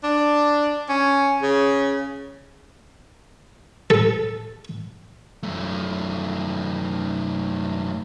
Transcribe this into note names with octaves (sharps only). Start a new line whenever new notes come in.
D4
C#4
C#3
A4
F#2 A3